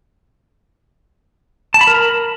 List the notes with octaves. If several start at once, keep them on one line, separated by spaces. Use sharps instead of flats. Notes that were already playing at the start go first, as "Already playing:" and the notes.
A5
B5
A#4